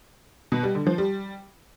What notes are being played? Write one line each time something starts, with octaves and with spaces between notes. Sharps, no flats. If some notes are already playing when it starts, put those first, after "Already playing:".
B2
G3
D3
F3
G3